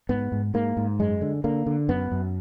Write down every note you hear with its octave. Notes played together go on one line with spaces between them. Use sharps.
G#2 B3
G#2
G#2 A#3
G#2
F#2 G#3
D3
D3 A#3
D3
F#2 B3
F#2